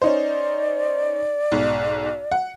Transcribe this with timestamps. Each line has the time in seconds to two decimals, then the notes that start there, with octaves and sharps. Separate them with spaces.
0.02 C#4 D#4 C5 D5
1.52 B1 G#2
2.32 F#5